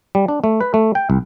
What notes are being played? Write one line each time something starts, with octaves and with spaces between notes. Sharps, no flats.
G3
D4
A3
B4
A3
G5
C2